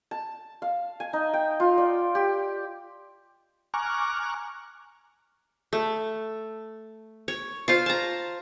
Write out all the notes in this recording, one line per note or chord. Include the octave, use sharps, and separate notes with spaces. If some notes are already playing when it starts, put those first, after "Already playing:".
A5
F5
G#5
D#4
G5
F4
D5
G4
G#5 A#5 C#6 D6 F6 F#6
A3
C#5
F4 C5 F5
A5 A#5